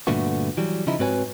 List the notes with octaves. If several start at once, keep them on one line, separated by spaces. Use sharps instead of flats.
G2 A#2 D3 A3 B3 F#4
E3 F#3 G3
C#3 F3 D#4 E4
G#2 C4 F#4 B4 C#5 G#5